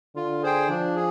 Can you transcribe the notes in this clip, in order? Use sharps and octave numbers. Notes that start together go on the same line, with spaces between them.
D3 F4
G#4 C5 G5
F3 D4
G#4